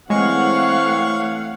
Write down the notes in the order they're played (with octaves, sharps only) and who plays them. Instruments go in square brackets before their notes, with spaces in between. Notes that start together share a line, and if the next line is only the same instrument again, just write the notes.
[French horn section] E3 C4 [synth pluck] G#3 [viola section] A3 F5 F#5 [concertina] C#5 C#6